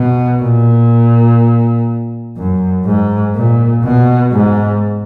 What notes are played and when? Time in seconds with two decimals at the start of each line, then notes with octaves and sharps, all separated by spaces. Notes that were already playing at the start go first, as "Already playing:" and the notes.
Already playing: B2
0.42 A#2
2.36 F#2
2.85 G#2
3.35 A#2
3.84 B2
4.32 G#2